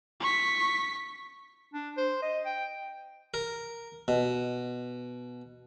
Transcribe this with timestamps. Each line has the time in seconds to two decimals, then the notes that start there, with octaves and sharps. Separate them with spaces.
0.20 C#6 B6
1.74 D4
1.97 C5
2.22 D#5
2.46 G5
3.34 A#4
4.08 B2